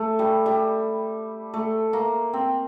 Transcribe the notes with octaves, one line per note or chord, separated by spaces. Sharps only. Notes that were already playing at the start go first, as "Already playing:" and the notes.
Already playing: A3
G3
G3
A3
A#3
C4